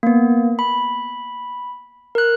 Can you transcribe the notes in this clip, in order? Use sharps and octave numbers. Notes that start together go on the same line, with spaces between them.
A#3 B3
B5
A#4 F#6